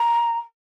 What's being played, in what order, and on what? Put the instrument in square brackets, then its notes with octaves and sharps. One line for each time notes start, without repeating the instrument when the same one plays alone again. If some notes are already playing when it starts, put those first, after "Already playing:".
Already playing: [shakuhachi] A#5